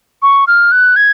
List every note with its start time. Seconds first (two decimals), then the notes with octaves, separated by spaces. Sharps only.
0.22 C#6
0.47 F6
0.72 F#6
0.96 G#6